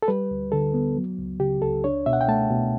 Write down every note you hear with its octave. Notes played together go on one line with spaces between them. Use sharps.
A4
G3 B4
D2
D3 A4
B3
F#3
C#2
C#3 G4
C#2 A4
D4 C#5
B2 E5
F#5
G5
A3 A5
B2